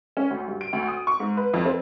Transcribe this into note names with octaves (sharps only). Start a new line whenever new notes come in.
C#4
D2
G2
D7
D2
D#6
C#6
G#2
B4
F2
C4